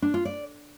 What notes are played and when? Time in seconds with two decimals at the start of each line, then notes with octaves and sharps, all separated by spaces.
0.02 D4
0.14 F4
0.25 D5